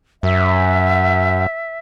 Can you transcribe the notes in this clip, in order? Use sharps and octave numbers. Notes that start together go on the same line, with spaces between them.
F#2 E5